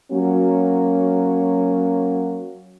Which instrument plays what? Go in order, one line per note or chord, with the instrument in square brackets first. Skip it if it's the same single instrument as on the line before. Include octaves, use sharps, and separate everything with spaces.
[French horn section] F#3 A#3 C#4 F#4